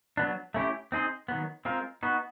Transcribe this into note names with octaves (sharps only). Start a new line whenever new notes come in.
F#3 B3 D4
A3 C#4 E4 G4
C4 D#4 G#4 C5
D#3 F#3 B3
G#3 C4 F4 A#4
B3 D#4 F#4